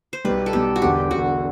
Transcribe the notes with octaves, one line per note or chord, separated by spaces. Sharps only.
C5
B1 B2 G3 B4
A4
B1 B2 G3 G4
F#4
E1 E2 D3 G4
E1 E2 D3 F#4